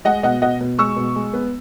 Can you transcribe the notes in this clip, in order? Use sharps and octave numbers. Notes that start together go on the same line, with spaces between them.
G#3 D#5 F#5
B2 D#5 F#5
B2 D#5 F#5
B2
G#3 C#6 E6
B2
G#3
B3